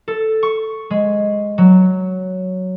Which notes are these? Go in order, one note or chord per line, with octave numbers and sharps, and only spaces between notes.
A4
C#6
G#3
F#3